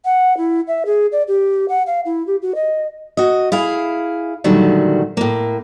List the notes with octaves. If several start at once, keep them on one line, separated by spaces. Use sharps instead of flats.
F#5
E4
E5
G#4
D5
G4
F#5
F5
E4
G4
F#4
D#5
F#4 D#5
E4 G#4 F5
A#2 D3 D#3 F#3 G3 A3
A2 A#3